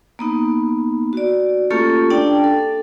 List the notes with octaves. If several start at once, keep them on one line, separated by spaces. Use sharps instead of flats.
A#3 B3 D#4
F#4 D5
A3 A#3 C#4 F4 G4 A4
D4 D5 G5 A5
A4